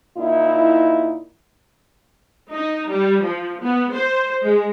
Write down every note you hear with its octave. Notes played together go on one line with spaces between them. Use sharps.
A#2 D#4 E4
D#4
G3
F3
B3
C5
G#3